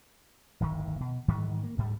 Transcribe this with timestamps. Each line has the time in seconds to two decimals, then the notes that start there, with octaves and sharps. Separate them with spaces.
0.60 D1 G1 A2 D#3
1.00 B2
1.28 G#2 D#3 E3 G3
1.63 A#3
1.77 D2 G#2 G3